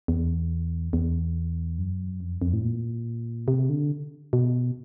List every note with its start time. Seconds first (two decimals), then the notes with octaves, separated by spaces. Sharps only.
0.08 E2
0.93 E2
1.78 F#2
2.20 F2
2.42 F2
2.53 A2
2.63 A#2
3.48 C3
3.69 D3
4.33 B2